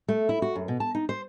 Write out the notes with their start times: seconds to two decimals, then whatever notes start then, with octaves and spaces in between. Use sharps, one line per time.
0.08 A3
0.29 E4
0.42 F#4
0.56 F#2
0.68 B2
0.80 A5
0.95 D#4
1.09 C5